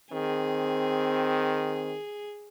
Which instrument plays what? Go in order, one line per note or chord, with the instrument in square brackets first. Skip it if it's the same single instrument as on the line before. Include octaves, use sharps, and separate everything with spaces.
[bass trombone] D#3 [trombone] C4 [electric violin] G#4